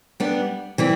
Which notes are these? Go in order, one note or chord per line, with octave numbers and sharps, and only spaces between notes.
G3 B3 D4
E3 G3 C4 E4